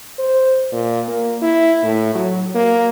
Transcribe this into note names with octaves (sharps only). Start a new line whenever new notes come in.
C5
A#2
A#3
E4
A2
F#3
A#3